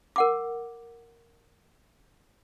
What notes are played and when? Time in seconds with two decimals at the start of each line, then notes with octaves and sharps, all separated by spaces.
0.16 A#4 F#5 D6